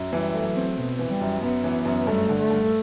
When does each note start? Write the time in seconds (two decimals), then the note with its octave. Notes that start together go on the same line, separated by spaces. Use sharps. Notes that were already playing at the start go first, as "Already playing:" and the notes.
Already playing: F#2
0.13 E3 G3
0.34 A3
0.45 F#3
0.56 C4
0.78 B2 B3
0.99 E3
1.10 G3
1.21 F#2
1.42 F#2 B3
1.64 E3
1.85 F#2
2.07 G2 A3
2.29 D3
2.39 A3
2.50 G2